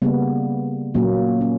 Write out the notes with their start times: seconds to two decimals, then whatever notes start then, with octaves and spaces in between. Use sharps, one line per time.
0.02 C#3 G3 A#3 B3
0.94 A#2 F#3 A#3 C#4
1.41 C#4